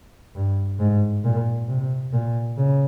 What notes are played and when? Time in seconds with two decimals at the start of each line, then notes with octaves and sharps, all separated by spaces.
0.36 G2
0.80 G#2
1.24 A#2
1.69 C3
2.13 A#2
2.58 C#3